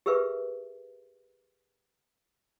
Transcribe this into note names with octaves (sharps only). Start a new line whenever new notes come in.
G4 G#4 A#4 B4 E5